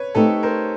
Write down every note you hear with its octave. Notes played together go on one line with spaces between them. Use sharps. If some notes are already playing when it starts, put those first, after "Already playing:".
Already playing: B4 C#5
A3 C4 D#4 G4 A4 B4
A#4 C5